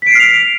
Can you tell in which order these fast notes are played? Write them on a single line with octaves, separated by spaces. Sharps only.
B6 D7 C7 F6 F7